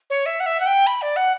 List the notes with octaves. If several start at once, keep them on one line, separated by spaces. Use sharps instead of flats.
C#5
E5
F#5
E5
F#5
G5
B5
D5
F#5